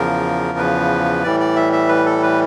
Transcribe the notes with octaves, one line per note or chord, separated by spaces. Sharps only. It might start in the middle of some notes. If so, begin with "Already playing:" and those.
Already playing: E2 C#3 F3 A#4
B4
A2 E3 G3 D5
D5
E5
E5
B4
A4
B4